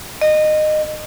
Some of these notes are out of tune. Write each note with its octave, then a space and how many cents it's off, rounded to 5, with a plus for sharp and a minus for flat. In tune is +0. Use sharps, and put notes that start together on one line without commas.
D#5 -20